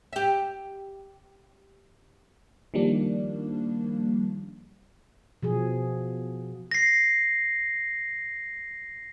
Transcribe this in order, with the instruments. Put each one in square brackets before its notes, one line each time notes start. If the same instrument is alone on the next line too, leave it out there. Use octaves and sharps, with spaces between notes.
[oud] G4 E5
[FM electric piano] D#3 F3 G3 A#3 D4
[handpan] B2 F3 G#4
[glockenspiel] A#6 C7